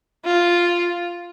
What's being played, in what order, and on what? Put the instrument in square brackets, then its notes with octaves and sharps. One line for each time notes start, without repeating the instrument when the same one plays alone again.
[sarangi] F4